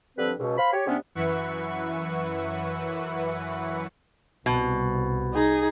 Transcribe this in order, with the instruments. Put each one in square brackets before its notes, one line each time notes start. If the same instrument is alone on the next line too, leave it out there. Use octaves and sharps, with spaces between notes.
[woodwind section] G2 D3 F3 C4 B4
C#2 B2
C5 F5 B5
G4 C#5
C3 G3 B3 C#4 D4
[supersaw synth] F#2 E3 B4 E5 F#5 C#6
[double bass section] C2 [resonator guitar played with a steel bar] B2
[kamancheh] D#4 G#4